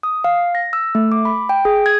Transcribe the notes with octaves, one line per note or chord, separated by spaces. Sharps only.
D#6
F5
A#6
E6
A3
D6
B5
G5
G#4
G#6